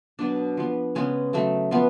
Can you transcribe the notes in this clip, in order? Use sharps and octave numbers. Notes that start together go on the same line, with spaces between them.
B2 F#3 B3 D4
F3 B3
C#3 G#3 B3 C#4
C#3 F#3 A3
F3 A3 B3